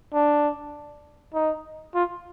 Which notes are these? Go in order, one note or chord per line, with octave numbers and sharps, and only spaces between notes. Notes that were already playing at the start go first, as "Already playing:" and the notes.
D4
D#4
F4